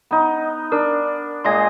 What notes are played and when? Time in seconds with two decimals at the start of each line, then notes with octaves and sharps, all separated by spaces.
0.11 B3 D#4
0.72 D4 A#4
1.44 A#2 G#3 G#5 C6 D#6 A#6